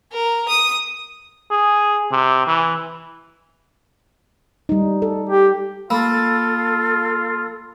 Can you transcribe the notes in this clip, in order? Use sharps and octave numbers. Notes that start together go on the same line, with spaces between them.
A#4
D#6
G#4
C3
E3
G3 D#4
A4
G4
A#3 F4 A4 B5 E6